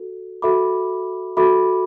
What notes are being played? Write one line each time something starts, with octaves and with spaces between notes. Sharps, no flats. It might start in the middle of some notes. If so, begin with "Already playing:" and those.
Already playing: F#4 A4
F#4 A4 E5 B5 D6
F#4 A4 E5 B5 D6